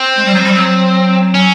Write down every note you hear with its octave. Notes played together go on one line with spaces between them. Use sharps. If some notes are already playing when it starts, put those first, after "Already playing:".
Already playing: C4
G#3
G3
F#3
G3
F#3
C#4